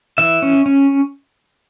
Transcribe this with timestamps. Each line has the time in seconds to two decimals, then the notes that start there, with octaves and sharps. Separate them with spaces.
0.18 E3 E5
0.42 C#4
0.66 C#4